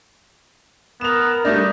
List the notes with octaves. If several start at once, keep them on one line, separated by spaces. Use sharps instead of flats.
B3 A#4 E7 F7
G3 A3 D4 D#4